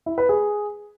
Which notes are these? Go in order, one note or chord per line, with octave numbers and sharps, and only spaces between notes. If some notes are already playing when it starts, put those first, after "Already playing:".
E4
B4
G#4